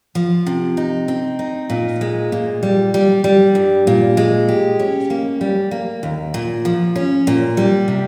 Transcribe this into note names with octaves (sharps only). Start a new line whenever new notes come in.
F3
C3
D#4
C4
D#4
A#2
G#3
A#2
G3
G3
G3
G2
A#2
G#3
G4
C#4
A#3
G3
A#3
D#2
A#2
F3
C#4
A#2
G3
C3